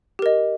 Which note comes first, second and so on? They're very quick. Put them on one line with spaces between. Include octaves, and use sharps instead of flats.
G4 A#4 D#5